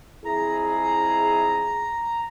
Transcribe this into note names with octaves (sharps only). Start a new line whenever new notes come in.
F2 E4 G#4 A#5